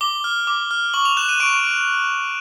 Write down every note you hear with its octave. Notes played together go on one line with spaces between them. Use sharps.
D6 G7
F6
D6
F6
C#6 F#7
F7
F#6 E7
D#7
C#6 D7